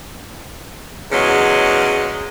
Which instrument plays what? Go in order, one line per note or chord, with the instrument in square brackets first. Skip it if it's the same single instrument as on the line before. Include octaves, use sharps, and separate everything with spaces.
[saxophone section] E2 C#3 F#3 G#3